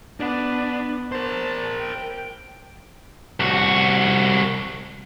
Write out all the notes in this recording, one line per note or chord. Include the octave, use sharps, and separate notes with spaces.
B3 D4
A#4 C5 A5
G5
C2 F#4